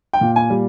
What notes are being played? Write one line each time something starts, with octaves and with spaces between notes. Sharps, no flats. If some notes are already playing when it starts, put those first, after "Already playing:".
G5
A#2
G#5
G3